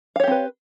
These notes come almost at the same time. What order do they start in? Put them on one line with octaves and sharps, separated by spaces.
F5 C#5 G4 C4 B4